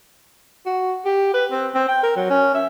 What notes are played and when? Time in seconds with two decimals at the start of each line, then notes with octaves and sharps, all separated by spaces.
0.66 F#4
1.05 G4
1.34 B4
1.52 C4
1.75 C4
1.88 G5
2.03 A#4
2.16 F#3
2.30 C#4
2.54 E5